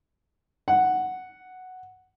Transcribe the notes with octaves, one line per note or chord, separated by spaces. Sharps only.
F#5